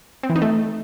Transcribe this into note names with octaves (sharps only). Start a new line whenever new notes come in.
C4
E3
D#4
A3